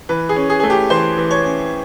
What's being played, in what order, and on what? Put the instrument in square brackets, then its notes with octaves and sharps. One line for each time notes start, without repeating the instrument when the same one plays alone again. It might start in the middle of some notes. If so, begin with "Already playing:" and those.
[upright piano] E3 B4
G#4
C#4
G#4
A3 G#4
G4
E3 C5
E3
C#5
C#4